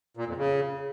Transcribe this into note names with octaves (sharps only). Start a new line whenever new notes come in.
A#2
F2
C#3